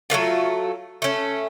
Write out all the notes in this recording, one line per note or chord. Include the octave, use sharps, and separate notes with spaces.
F#3 A3 A#3 F4
A3 C#4